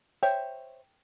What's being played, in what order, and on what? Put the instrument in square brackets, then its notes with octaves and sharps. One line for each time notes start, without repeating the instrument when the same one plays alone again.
[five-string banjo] C5 C#5 E5 [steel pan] G5